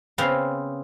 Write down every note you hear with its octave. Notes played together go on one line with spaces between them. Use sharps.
C#3 B3 C4 F5